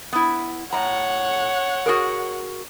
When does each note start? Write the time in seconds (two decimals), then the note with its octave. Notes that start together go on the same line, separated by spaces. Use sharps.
0.13 B3 E4
0.73 A2 C#5 F#5 A#5
1.86 F#4 G#4 A#4